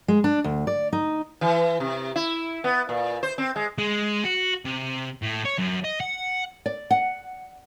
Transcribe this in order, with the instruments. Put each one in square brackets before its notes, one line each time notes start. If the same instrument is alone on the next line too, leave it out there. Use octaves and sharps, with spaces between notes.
[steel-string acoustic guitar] G#3
D4
D2
D5
D#4
[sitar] E3
C3
E4
B3
A#2
C5
C4
G#3
[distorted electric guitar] G#3
F#4
C3
A2
C#5
F#2
D#5
F#5
[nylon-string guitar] D5
F#5